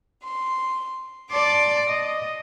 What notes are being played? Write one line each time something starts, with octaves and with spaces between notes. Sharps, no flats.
C6
D5 A5 C6 D6
D#5